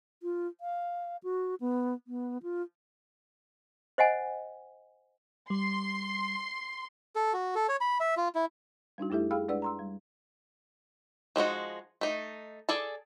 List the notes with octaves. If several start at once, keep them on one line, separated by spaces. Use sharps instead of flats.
F4
F5
F#4
B3
B3
F4
C5 D#5 F#5 G#5
G3 C6
A4
F#4
A4
C#5
B5
E5
F4
E4
G3 D4 D#4 F#4
F2 A3 E4 G4 A4 E5
G#4 F5 G5 B5 E6 F6
G#3 D4 B4 D5 F#5 E6
A#5 C6 E6
G3
F3 G#3 D#4 F#4
A3 D#4
G#4 A4 D5 A5